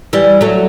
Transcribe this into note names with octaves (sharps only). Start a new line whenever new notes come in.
E3 G3
F#3 A3